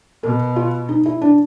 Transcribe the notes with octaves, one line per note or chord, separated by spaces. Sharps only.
B2 A#4
F4
D#4
E4
D4